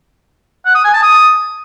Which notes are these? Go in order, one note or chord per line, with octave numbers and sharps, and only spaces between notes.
F#5
D#6
G#5
A5
D#6